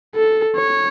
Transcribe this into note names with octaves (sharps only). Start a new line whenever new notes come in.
A4
C#5